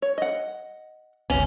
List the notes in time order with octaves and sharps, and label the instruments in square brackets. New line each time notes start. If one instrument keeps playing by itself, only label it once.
[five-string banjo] C#5
D#5 F#5
[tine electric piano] G1 C#2 [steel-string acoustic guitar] C#4